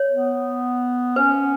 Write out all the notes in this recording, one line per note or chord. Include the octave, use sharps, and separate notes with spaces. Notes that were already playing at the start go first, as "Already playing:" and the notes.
Already playing: C#5
B3
C#4 B4